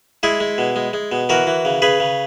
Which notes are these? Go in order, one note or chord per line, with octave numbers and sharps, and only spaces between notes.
G#3 E4 G#4
G#3
B2
G#3
G#3
B2
E3 F#4 A#4
E3
C#3
C#3 G#4 B4
C#3